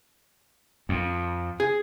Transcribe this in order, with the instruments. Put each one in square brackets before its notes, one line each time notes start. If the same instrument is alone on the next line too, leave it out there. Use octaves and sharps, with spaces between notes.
[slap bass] F2
[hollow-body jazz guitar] G#4